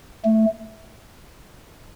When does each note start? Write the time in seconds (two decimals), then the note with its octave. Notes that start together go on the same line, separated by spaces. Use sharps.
0.24 A3